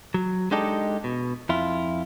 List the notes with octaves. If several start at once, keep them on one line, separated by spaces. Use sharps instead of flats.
F#3
G#3 D4 D#4 G4 A4 D#5
B2
F2 E4 F4